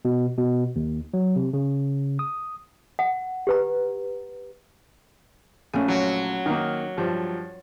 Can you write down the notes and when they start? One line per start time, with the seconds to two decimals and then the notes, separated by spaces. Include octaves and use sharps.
0.05 B2
0.38 B2
0.76 D#2
1.14 F#3
1.36 C3
1.53 C#3
2.19 D#6
2.99 F#5
3.47 G4 B4 A#5
5.73 A#1 A3 C#4 G#5
5.88 F#3
6.46 D#3 A#3
6.98 G2 F3